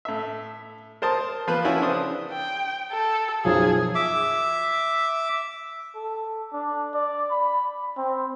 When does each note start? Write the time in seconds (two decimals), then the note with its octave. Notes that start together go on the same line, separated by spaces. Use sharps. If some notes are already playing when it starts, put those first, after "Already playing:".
0.05 A2 E5
1.02 A#4 C5 A5 D#6
1.48 F3 A#3 B4
1.65 C#4 D4 E4 F#4
1.81 C#3 D4 C5 D#6
2.31 G5
2.92 A4
3.44 B1 F#2 F3 G#4
3.95 E5 D6
5.95 A4
6.53 D4
6.94 D5
7.31 B5
7.97 C4